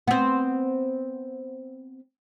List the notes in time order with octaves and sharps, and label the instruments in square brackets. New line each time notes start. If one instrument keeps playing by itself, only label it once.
[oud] B3 C4